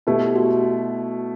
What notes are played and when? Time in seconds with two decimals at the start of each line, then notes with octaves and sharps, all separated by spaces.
0.07 B2 A3 E4 G4
0.36 F#4